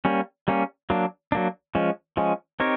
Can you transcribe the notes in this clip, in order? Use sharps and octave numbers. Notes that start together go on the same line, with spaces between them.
G3 A#3 C#4
G3 A#3 C#4
F#3 A#3 D4
F#3 A#3 D4
F3 G#3 C#4
F3 G#3 C#4
C4 D#4 G4 A#4 C#5